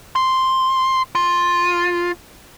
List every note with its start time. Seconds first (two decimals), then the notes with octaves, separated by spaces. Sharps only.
0.16 C6
1.15 F4